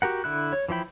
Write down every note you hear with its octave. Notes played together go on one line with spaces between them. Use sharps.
F#4 G4 A#4 F#5
D3 E4 F#6
C#5
E3 F3 E4 G5 B5